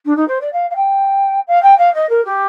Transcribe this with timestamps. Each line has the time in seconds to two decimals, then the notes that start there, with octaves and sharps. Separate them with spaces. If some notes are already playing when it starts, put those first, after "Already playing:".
0.05 D4
0.16 D#4
0.27 C5
0.40 D5
0.52 F5
0.70 F5
0.75 G5
1.47 F5
1.62 G5
1.78 F5
1.94 D#5
2.09 A#4
2.25 G4